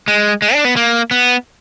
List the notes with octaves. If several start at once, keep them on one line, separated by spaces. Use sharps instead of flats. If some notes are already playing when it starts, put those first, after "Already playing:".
G#3
G#3
D4
B3
A#3
B3